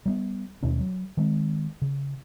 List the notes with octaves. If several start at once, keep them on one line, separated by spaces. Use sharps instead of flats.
G3 G#3 B3
D#2 B2 A3 C#4
F#3
D#3 G#3 C4
C#3